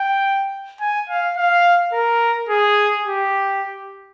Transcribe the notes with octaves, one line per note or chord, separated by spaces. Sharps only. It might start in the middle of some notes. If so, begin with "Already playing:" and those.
Already playing: G5
G#5
F5
F5
A#4
G#4
G4